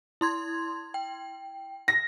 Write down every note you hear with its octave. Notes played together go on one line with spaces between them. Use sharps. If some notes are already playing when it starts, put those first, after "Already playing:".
E4 C6 G#6
G5
A#6